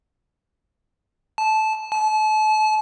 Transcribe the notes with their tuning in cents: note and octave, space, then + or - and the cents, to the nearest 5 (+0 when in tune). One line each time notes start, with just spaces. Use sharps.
A5 -15
A5 -35